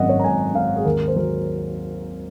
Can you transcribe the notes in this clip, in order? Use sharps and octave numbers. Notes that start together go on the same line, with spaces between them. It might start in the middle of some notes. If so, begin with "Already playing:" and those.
Already playing: G#1 F#2 D#5 F#5
C#5
A#5
G#1 G#5
G#1 F5
G#4
D#2 A#4
C5
F#3 A#4